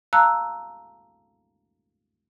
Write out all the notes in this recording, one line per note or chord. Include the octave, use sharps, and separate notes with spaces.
F5 A5 A#5 E6 F#6